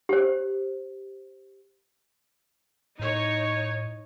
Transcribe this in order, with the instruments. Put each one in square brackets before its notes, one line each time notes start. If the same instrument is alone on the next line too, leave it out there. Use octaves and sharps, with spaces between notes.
[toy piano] G4 C5
[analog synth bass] A2 [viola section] D#4 C#5